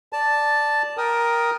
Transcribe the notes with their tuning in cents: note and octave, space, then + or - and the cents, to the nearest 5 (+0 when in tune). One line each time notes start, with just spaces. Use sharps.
D5 +0 A5 +0
A#4 +10 G5 +0 D#6 +0